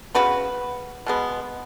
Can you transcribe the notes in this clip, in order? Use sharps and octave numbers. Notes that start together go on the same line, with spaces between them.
C#3 B3 F#4 B4
B2 G#3 B3